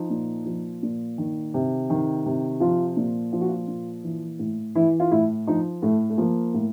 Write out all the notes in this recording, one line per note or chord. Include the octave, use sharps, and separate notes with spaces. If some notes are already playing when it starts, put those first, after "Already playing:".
Already playing: F3 D#4
A#2
F3
A#2
D#3
C3
D#3
C3
F3 F4
A#2
F3 F4
F#4
F4
A#2
E3
A2
E3 E4
F4
A2 E4
F3 D#4
A2 A3
A3
F3 A#3
A2